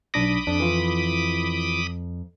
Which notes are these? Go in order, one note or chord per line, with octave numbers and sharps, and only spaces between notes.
B1 D4 B5 D6 D#6 A#6
F2 D4
E3 E4 F4